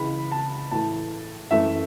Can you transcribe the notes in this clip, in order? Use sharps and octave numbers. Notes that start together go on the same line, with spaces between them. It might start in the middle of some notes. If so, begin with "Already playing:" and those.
Already playing: C#2 C#3 E3 B5
A5
A2 E3 A3 A5
F#2 E3 A3 E5